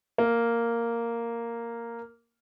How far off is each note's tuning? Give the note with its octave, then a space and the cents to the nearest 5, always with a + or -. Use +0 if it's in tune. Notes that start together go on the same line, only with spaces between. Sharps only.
A#3 -5